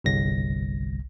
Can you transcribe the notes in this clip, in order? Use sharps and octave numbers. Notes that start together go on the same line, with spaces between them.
G1 C2 A#6